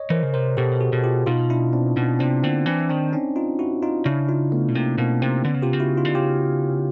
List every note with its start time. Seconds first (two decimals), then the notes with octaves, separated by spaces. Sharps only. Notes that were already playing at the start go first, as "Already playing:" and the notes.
Already playing: C#5 D#5
0.10 E3 A#4 C5
0.23 C#3
0.34 C3 A#4 C5
0.57 B2 G4 A4
0.80 F#4 G#4
0.93 B2
1.04 F4 G4
1.27 B2 D#4 F4
1.50 D4 E4
1.73 C4 D4
1.96 B2 B3 C#4
2.19 C3 C4 D4
2.43 D3 A#3 C4
2.66 E3 C4 D4
2.90 D#3 C4 D4
3.13 C#4 D#4
3.36 D#4 F4
3.59 E4 F#4
3.82 D#4 F4
4.05 C#3 D4 E4
4.29 D#4 F4
4.52 A3 B3
4.68 B2
4.75 C3 A#3 C4
4.98 B2 A#3 C4
5.22 C3 A#3 C4
5.45 D3 B3 C#4
5.54 C#3
5.62 C3 F4 G4
5.73 C#3
5.80 E4 F#4
5.97 D#4 F4
6.05 D3
6.15 C#3 F4 G4